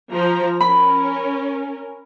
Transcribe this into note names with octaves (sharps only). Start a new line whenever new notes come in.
F3 A#5
C#4 A#4 B5